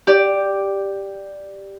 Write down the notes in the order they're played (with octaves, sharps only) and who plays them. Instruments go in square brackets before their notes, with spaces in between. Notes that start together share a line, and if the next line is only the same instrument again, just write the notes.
[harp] G4 D5